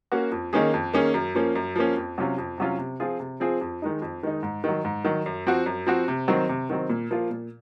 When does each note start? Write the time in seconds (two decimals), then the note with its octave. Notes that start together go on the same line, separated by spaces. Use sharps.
0.12 A#3 C#4 F#4
0.32 F2
0.53 D#3 A#3 C#4 G#4
0.74 F2
0.93 D#3 A#3 C#4 G#4
1.14 F#2
1.35 F3 A#3 C#4
1.55 F#2
1.76 F3 A#3 C#4
1.97 F2
2.18 C3 F#3 C#4 F4
2.38 F2
2.58 C3 F#3 C#4 F4
2.78 C3
3.00 F3 C4 F4 G#4
3.20 C3
3.40 F3 C4 F4 G#4
3.61 F2
3.82 D#3 G#3 D#4
4.02 F2
4.23 D#3 G#3 D#4
4.43 G#2
4.64 D#3 F#3
4.84 G#2
5.05 D#3 F#3
5.26 F#2
5.47 F3 C4 F#4
5.66 F#2
5.86 F3 C4 F#4
6.08 C3
6.28 D#3 F#3 C4
6.49 C3
6.70 D#3 F#3 C4
6.89 A#2
7.11 F3 A#3 F4
7.30 A#2